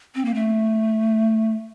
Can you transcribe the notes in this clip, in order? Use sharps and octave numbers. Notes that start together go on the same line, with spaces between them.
C4
A#3
A3